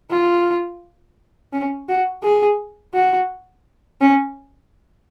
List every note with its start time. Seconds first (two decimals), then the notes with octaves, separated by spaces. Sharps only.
0.11 F4
1.53 C#4
1.89 F#4
2.23 G#4
2.94 F#4
4.01 C#4